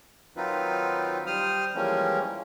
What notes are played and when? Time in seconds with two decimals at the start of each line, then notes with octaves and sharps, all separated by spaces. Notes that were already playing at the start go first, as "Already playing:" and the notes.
0.36 D#3 F#3 C4 D#4 F4 B4
1.27 G3 C5 D#6 F6
1.75 E3 F3 G3 G#3 A#3 C#4